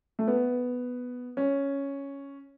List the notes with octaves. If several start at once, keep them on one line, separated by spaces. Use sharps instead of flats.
A3
B3
C#4